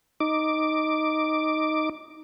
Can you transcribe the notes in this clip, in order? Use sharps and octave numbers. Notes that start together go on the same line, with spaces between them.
D#4 D6